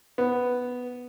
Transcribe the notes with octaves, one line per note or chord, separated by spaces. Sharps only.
B3